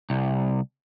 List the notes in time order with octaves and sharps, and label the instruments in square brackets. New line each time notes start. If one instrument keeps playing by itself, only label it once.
[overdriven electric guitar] C2